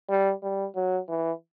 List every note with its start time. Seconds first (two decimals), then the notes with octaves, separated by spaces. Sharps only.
0.10 G3
0.43 G3
0.76 F#3
1.09 E3